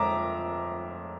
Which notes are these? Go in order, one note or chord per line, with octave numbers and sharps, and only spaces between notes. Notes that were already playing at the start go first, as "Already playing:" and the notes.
Already playing: F2 E5 A#5 D6